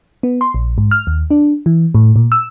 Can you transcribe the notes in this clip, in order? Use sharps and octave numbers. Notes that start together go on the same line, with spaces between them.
B3
C6
A#1
G#2
F6
D#2
D4
E3
A2
A#2
E6